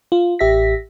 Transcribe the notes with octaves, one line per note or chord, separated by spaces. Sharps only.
F4
A1 G4 E5 A#6 B6